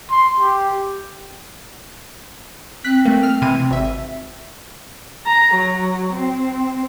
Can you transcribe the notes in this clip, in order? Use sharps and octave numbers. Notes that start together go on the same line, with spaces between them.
C6
G4
C4 F#6 B6
A3 A#3
F6
C3 E3 D#7
G#1 E5
A#5
F#3
C4